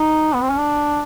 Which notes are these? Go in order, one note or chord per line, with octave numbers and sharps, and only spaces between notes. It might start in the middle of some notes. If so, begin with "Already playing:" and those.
Already playing: D#4
B3
C4
C#4
D4